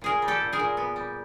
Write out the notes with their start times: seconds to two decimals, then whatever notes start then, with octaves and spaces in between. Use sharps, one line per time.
0.01 A#2 G#4 A#4
0.22 G3
0.28 G4 A4
0.41 A#2
0.53 G#4 A#4
0.59 A#2
0.77 B3
0.96 G3